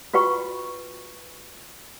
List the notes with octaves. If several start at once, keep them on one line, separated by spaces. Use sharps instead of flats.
F4 F#4 B4 G5 C#6